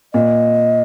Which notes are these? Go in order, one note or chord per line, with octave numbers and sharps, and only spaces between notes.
A#2 D#5